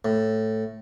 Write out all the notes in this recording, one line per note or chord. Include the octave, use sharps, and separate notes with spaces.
A2